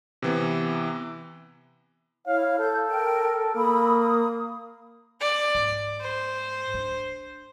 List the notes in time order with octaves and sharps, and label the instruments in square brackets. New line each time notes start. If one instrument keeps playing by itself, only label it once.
[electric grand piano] C3 E3 B3
[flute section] E4 C#5 [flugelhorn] F5
[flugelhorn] A4 [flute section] G6
[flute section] A#4 G5 F6
[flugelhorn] A#3 [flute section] B5 D#6 E6
[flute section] D#6
[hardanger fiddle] D5
[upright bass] G#2
[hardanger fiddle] C5
[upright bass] D4